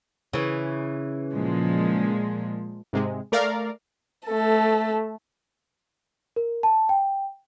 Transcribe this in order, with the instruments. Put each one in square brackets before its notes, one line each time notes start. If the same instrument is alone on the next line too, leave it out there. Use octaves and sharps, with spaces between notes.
[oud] C#3 E3
[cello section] A#2 F3 G#3
[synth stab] G#2 C3 G#3
A3 A#4 D5 F5
[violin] A3 A4
[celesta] A#4
A5
G5